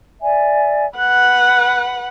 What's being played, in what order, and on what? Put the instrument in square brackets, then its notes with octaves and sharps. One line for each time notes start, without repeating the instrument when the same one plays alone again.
[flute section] D5 E5 G#5
[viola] B4 F#5 [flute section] F#6